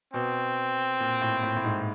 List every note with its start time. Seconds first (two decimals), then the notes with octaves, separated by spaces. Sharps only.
0.14 B2 C4
1.00 A#2
1.22 A2
1.43 A2
1.57 A2
1.64 G#2